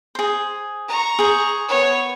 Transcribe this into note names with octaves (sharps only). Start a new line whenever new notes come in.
G#4 C5
A#5 C#6
G#4 C5
B3 C#5